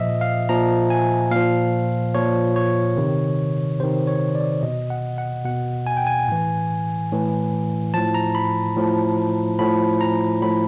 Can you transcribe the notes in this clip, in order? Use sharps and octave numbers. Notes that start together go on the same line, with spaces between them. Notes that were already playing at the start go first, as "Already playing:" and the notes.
Already playing: A#2 F3 D#5 E5
F5
A#2 F3 A#5
G#5
A#2 F3 F5
A#2 F3 C#5
C#5
C3 D#3
C3 D#3 C5
C#5
D5
B2 D#5
F#5
F#5
B2 F#5
G#5
G5
G#5
A2 E3
A2 E3
A2 F3 A5
A#5
B5
A2 F3
A2 F3 B5
A#5
A2 F3 B5